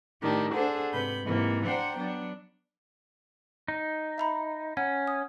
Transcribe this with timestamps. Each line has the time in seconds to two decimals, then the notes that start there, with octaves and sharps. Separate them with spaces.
0.22 A2 D#3 D4 G4
0.53 D4 G#4 A4 C5 F#5
0.93 G#2 C3 B4 B5 G6
1.24 G#2 C3 E3 A#3
1.66 D4 C5 F#5 G5 A#5
1.98 F#3 B3 D4
3.68 D#4
4.18 E5 A#5 B5
4.77 C#4 F#5
5.07 D#6